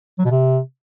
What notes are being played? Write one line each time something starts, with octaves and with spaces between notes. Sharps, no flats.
F#3
B2
C3